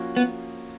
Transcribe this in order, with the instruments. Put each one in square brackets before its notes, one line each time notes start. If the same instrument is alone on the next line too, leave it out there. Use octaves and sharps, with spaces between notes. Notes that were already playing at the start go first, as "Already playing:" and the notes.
Already playing: [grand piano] F3 A#3 C#4 F#4
[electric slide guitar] B3